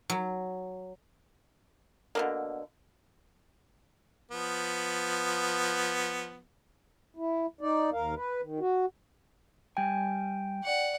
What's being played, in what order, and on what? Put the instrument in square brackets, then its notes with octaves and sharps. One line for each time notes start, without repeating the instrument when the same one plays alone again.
[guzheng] F#3
[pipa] B2 D3 A#3
[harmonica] F3 B3
[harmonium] E4
D#4 D5
D#2 A#4 F5
B4
D#3
F#4
[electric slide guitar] G3 G#5 [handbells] G5
[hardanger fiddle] D5 F#5